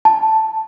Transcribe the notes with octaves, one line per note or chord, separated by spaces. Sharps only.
A5